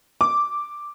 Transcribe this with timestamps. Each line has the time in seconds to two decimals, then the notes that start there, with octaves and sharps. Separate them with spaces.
0.21 D6